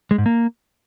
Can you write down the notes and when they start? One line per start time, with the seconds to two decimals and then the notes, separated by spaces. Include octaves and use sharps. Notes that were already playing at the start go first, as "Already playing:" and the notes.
0.11 G#3
0.18 G#2
0.26 A#3